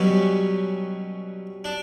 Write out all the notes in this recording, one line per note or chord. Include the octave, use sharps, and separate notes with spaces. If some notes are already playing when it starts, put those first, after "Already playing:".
Already playing: B2 F#3 G3 C#4 F#4
D4